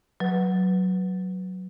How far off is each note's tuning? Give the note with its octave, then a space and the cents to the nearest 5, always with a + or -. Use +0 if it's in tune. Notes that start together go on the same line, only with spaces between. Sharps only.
F#3 +0 B4 +0